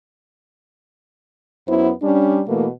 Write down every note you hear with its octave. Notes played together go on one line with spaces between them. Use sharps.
F#2 B3 E4 C5
G3 C#4 D4
B2 E3 A3 A#3